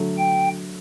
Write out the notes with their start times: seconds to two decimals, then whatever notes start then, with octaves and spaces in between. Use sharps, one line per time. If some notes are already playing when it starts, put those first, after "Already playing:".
Already playing: D3 F#3 A3
0.18 G5